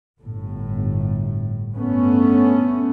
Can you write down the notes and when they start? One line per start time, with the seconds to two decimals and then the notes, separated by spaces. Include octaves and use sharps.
0.19 G1 A2
1.76 G2 A3 B3 C#4